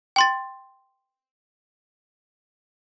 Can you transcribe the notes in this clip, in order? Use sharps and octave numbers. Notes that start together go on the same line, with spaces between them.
G5 C6 A6